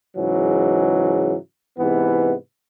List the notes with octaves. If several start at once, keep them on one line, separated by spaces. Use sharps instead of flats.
G#2 C#3 E3 F#3
G#2 C3 E3 B3